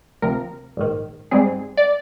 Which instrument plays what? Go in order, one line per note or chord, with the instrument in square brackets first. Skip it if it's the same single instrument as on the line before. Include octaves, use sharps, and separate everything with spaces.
[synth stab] D2 C3 F3 A#4
A#1 G#2 D#3
G#2 G3 C4 G#4
D5